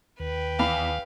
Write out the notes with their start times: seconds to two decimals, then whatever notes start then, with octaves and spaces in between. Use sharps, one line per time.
0.20 D#2 B4 G5
0.59 E2 F5 B5